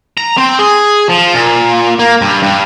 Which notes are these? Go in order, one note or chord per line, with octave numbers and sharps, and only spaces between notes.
A#5
C4
G#4
F3
A#2
A#3
G2
G2